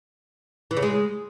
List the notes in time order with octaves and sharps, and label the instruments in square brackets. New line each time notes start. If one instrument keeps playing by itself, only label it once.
[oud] E3
C#3
G#3